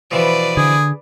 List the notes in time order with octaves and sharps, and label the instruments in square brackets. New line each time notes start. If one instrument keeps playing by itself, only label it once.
[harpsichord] B2 E3 F3 [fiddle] B4 D5
[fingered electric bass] D3 [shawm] G#4